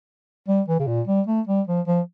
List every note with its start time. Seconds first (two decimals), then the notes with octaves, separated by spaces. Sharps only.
0.48 G3
0.68 E3
0.79 C#3
0.88 A#2
1.07 G3
1.27 A3
1.48 G3
1.67 F3
1.87 F3